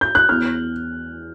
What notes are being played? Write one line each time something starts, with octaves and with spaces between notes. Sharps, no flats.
G6
F#6
E2 F6